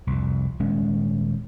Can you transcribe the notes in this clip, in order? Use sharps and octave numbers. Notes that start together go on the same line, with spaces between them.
C2 F2
D#1 G#3 C#4